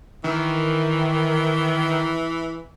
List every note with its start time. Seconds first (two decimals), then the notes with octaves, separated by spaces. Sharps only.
0.24 D#3 E3